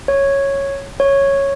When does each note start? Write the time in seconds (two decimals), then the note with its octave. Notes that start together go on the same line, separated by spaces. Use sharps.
0.08 C#5
1.00 C#5